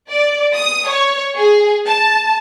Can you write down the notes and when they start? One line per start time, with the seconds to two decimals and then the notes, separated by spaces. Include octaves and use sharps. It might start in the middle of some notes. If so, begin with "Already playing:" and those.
0.10 D5
0.54 D#6
0.89 C#5
1.36 G#4
1.86 A5